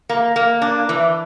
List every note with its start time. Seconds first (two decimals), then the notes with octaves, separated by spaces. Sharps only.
0.09 A#3
0.36 A#3
0.62 D4
0.89 E3